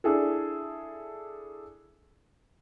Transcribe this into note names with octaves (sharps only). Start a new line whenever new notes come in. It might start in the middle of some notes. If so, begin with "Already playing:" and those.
D4 E4 G#4 A4